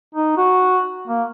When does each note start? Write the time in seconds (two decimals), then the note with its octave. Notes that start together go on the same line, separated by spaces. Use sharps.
0.15 D#4
0.38 F#4
1.08 A#3